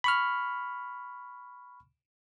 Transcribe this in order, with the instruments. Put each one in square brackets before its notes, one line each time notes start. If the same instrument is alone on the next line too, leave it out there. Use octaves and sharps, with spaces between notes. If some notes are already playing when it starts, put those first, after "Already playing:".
[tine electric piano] B5 C#6 F6